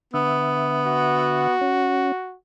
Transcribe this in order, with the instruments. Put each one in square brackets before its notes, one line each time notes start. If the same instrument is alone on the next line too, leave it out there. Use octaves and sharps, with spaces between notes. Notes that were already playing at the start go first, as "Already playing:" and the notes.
[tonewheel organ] D3 E5 [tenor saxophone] B3
[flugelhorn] F#4
[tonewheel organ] C#4